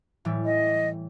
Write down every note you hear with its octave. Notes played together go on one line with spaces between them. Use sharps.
A2 E3 G3
D#5